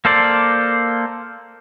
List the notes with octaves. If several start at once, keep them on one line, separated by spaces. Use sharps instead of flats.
A#3 A4 C5 D5